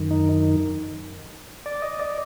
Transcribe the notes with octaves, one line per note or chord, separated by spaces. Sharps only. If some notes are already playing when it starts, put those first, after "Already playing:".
Already playing: F#2 D#3
D#4
D5
D#5
D5